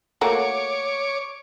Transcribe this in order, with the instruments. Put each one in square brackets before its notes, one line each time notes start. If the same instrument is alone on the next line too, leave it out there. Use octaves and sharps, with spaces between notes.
[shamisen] A3 A#3 F#4 [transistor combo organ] C#5 D6